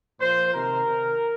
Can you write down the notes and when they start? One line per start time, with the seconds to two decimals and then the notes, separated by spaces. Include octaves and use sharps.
0.20 A#2 F3 C5
0.53 C3 D#3 A#4
0.86 C3 D#3